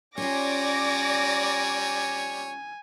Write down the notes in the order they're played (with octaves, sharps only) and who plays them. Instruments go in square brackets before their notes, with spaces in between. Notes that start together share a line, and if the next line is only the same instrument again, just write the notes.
[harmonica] G3 C#5 [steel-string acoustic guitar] C#4 F4 [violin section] D5 D6 A#6 [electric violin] G#5